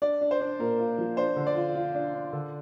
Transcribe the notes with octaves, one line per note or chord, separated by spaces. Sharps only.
D4 D5
D4
C5
D4
A#2 A#4
F4
F3
D4 C5
D3
D5
F4
F4
D4
D4
D3